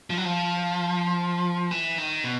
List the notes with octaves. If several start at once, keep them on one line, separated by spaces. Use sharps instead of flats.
F3
F#3
F3
E3
D#3
B2